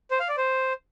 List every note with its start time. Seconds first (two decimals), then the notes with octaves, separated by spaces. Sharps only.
0.11 C5
0.20 F5
0.29 D5
0.37 C5